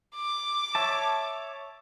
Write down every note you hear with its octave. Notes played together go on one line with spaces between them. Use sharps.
D6
C#5 E5 A5